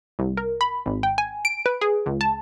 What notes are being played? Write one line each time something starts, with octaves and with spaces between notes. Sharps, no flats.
C2
A#4
B5
G#1
G5
G#5
D7
B4
G#4
C#2
A5